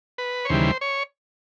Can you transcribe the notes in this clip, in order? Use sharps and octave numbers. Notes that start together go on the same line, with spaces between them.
B4
C#5
D#2 C#3 E3 G3 C5
C#5